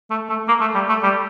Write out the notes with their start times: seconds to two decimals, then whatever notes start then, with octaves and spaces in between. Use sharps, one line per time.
0.10 A3
0.29 A3
0.48 A#3
0.61 A3
0.75 G3
0.89 A3
1.03 G3